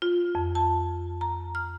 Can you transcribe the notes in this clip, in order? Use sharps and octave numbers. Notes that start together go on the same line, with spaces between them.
F4
F2
A5
A#5
F6